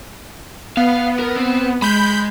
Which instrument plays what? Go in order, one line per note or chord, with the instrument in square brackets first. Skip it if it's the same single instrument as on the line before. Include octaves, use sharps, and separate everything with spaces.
[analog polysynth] B3 [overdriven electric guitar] F5
[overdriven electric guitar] A#4
C4
[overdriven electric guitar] G#3 [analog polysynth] B5 G6